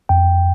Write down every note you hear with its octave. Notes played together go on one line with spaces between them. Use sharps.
F2 G5